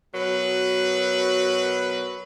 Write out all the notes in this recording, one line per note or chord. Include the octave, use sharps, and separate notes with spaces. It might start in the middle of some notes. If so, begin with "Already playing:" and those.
B2 F#3 A#4 B4